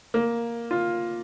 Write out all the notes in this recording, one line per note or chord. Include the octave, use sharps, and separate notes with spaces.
A#3
F4